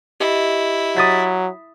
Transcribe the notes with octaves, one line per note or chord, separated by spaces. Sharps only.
E4 G4 D#5 E5
F#3 D#6 A6 B6